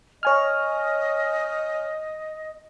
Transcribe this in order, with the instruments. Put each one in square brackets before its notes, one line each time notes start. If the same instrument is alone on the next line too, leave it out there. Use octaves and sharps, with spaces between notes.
[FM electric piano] C#5 G#5 F6 [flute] D#5